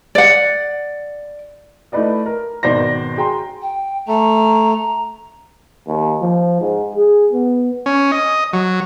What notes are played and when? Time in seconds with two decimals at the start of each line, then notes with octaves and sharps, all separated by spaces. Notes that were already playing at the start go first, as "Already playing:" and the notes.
0.15 D5 F#5
1.92 A3 D#4 E4 B4 D5 D#5
2.26 A#4
2.63 G#1 B2 D#3 C5 D5 A#6
3.17 F#4 G#4 G5 A#5 C6
3.62 G5
4.08 A3 A#5
5.88 D#2
6.22 F3
6.61 G#2
6.96 G#4
7.32 B3
7.86 C#4
8.12 D#5
8.53 F#3